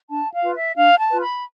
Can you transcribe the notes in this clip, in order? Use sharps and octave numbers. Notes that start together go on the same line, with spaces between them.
D4 A5
F5
F4 B4
E5
D4 F5
A5
F4 B4
B5